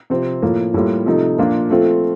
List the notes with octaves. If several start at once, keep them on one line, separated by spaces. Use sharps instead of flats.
C3 F3 C4
A2 F3 A#3
A2 G3 A#3 F4
C3 F3 A3 D#4
A#2 F3 A#3 D4 F4
F3 A3 C4 F4